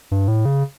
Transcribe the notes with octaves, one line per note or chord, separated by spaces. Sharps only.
G2
A2
C#3